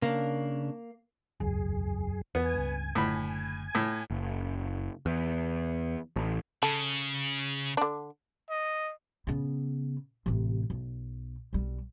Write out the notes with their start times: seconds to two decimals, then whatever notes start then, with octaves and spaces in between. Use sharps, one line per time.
0.02 C#3 A#3 D4
1.40 E1 C#2 F#2 G#4
2.35 E2 B3 G#5
2.54 C#2 G2
2.95 F#1 A2 D3 A3 B5
3.75 A2
4.10 F#1
5.06 E2
6.16 A1
6.63 C#3 A4
7.77 D3 D4
8.49 D#5
9.27 C#3 B3
10.26 A1 C3
10.70 B1
11.53 B1 G3